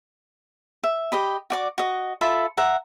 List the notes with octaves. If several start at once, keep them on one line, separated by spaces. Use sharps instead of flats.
E5
G4 D#5 B5
F#4 D5 D6
F#4 D#5
F4 A4 E5 B5
E5 F#5 A#5